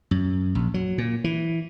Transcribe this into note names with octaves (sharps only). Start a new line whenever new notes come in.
F#2
A#1
F#3
A#2
E3